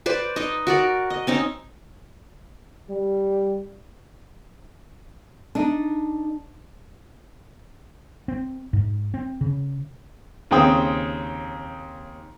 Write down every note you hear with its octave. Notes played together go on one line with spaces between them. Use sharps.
B4 C5 D5
D#4 D#5
F#4 A#4 D5
D#5
C4 C#4 D#4
G3
D4 D#4
C4
G#2
C4
C#3
D#2 C#3 C4 C5 G5 D#6